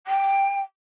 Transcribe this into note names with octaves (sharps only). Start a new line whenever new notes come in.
G5